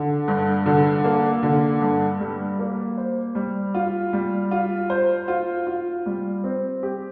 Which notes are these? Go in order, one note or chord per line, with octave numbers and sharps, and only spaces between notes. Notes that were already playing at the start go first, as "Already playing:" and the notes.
Already playing: D3
G2
D3
A#3
D3
G2
G3
A#3
C5
G3
F4
G3
F4
C5
F4
F4
G3
C4
G4